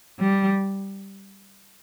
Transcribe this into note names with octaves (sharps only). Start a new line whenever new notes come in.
G3